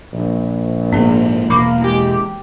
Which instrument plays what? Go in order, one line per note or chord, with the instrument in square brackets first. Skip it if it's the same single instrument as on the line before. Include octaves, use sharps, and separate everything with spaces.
[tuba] A#1
[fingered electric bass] G#2 A#3 [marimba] B3 G#4
[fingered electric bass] E1 [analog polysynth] A#3 [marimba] B5 C#6 D6
[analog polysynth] G#3 G4